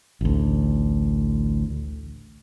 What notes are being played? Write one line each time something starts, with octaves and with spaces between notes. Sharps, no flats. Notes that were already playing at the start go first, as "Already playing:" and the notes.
A1 D2